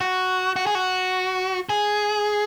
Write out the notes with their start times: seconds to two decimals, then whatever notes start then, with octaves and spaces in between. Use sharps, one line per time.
0.01 F#4
0.56 F#4
0.67 G#4
0.75 F#4
1.69 G#4